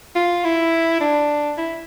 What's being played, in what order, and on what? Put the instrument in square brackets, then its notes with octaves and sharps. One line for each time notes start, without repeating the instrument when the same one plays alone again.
[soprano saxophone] F4
E4
D4
E4